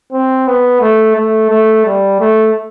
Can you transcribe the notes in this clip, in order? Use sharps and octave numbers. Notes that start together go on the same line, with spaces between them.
C4
B3
A3
A3
A3
G3
A3